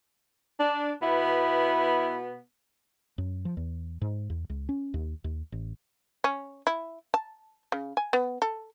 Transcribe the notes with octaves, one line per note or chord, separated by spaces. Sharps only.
D4
B2 B3 E4 B4
F#2
F3
E2
G#2
E2
C#2
C#4
D#2
D#2
A1
C#4
E4
A5
C#3
G#5
B3
A4